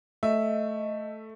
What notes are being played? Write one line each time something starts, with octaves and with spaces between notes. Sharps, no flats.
A3 D#5 E5